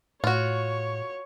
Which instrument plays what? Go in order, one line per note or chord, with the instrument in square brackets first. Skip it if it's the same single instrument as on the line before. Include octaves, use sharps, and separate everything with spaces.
[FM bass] A2 [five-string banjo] F4 F#4 [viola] C#5